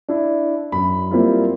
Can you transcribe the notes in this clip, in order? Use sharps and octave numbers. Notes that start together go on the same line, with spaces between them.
D4 E4
F#2 B5
G3 A#3 C4 E4 F4